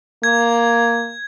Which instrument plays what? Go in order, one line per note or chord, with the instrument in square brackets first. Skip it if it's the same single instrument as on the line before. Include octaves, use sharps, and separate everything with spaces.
[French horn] A#3 [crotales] G#6